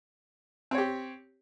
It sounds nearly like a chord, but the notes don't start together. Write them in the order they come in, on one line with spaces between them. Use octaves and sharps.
C4 C#5 G4